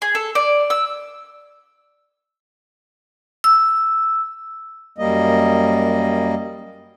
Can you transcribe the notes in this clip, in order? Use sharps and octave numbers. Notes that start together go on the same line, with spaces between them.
G#4
A4
D5
E6
E6
F#2 G3 A#3 D#5